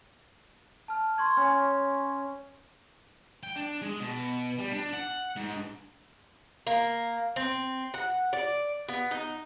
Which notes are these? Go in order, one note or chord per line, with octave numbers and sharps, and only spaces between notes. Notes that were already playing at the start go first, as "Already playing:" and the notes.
A5 F6
C6 C#6 G#6
C#4
G5
D4
G#3
B2
G3
D4
F#5
G#2
A#3
C4
F#5
D5
B3
D#4